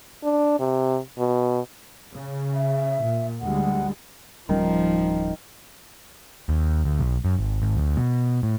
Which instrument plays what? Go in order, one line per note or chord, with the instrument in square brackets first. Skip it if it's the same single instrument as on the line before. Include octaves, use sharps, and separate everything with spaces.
[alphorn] D4
C3
B2
[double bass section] C#3
[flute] E5
[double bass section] A#2
[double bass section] D2 G3 G#3 [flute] F#5
[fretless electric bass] D1 G3 C#4 [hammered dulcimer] D#3 [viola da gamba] F3
[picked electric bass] D#2
D2
B1
F#2
G#1
G#1
D2
B2
A2